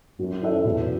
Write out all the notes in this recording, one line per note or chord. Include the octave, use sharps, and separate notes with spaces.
F#2 F#3
C#4 E4 A4 E5
E2 B2